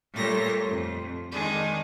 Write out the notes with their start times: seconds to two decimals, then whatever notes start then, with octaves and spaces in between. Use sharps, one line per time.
0.14 A#2 G3 A3 C#5 A#6
0.66 F2
1.30 D#3 G#3 D4 G#4